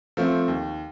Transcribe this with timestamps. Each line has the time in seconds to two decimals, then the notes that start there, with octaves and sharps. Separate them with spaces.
0.17 F3 A3 C4
0.48 D#2